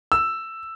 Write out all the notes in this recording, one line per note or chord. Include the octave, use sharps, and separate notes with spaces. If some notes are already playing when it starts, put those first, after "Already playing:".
E6